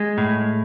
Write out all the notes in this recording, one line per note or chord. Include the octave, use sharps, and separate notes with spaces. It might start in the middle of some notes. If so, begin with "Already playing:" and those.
Already playing: G#3
A2